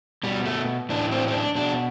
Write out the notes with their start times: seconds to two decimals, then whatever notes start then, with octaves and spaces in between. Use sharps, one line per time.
0.23 B2 G3
0.45 A3
0.89 A2 E3 D4
1.12 C4
1.28 C4
1.33 D4
1.55 B2 D4